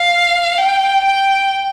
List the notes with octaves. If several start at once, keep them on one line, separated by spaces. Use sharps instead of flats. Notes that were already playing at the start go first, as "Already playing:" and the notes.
Already playing: F5
G5
G5